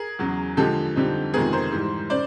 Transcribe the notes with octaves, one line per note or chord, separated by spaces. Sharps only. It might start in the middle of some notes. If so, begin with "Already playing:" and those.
Already playing: G#4 A#4
E2 C#3 F#3
D3 F3 G#3 G4 A4
F2 D3 G3 C4 D#4
F2 C3 D#3 G#3 B3 G#4 A#4
A#4 C5
G#2 E3 G3
C#3 C5 D5